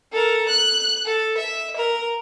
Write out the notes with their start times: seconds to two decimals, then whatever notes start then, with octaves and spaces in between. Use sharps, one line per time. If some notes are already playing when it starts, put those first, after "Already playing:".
0.12 A4 A#4
0.49 F#6
1.05 A4
1.37 E5
1.76 A#4